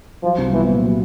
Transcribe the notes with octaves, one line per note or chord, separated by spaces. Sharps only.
F3 F#3
C2
E3 B3
A#2
F#3